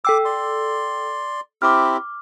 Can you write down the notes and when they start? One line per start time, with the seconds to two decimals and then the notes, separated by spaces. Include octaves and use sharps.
0.05 A4 G5 D6 E6
0.25 D5 C6
1.62 C4 E4 G4 D6 F6